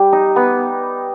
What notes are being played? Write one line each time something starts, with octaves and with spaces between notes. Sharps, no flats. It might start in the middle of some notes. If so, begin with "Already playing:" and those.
Already playing: G3
D#4
B3